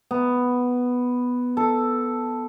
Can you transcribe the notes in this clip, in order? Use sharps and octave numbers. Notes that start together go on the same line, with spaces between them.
B3
A4